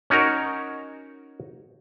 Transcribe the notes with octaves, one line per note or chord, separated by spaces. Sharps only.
C#4 D#4 F#4 A#4 C#5